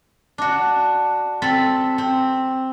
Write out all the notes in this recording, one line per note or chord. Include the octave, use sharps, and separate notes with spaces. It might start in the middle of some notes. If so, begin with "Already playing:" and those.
D4 F#4
C4 A4 A5 B5
C4